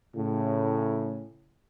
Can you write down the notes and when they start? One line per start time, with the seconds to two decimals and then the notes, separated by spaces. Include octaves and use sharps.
0.16 A2 C#3